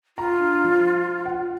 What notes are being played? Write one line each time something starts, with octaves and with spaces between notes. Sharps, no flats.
F4 A#5
D4
F3
F#5